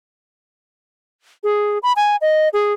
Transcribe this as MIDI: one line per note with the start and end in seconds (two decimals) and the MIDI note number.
1.44 1.78 68
1.83 1.92 83
1.96 2.16 80
2.21 2.49 75
2.53 2.73 68